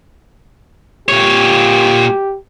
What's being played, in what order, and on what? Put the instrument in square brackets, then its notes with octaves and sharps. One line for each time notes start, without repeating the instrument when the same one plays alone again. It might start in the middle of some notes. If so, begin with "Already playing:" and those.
[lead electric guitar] A#2 C#5 [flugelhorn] G4